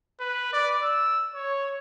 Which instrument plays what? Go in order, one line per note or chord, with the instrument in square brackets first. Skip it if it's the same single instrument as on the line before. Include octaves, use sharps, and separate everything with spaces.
[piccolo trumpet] B4
D5
E6
C#5